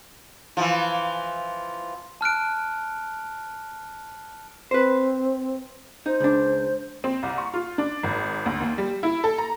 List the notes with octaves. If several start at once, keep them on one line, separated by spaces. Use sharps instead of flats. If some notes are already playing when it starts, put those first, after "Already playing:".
E3 F3
A5 F6 F#6 D7
C4 B4 C5
D#4 C5
C#2 D4
C4
C2
C#6
F4
D4
G#1
D2
D#2
G3
E4
A4
A#5